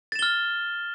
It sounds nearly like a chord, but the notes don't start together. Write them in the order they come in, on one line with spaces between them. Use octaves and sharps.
A6 E7 G7 F6